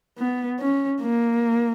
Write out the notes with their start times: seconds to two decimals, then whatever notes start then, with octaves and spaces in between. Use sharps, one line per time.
0.18 B3
0.60 C#4
1.01 A#3